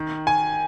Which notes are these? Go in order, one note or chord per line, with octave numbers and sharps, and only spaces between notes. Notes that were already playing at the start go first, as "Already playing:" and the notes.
Already playing: D#3
G#5